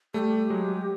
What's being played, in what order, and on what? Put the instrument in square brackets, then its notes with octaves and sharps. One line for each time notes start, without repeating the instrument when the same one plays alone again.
[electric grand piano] G3 A3 [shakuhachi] G4 G#4
[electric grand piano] F#3 G#3